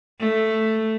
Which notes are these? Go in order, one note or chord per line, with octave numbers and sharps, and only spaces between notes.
A3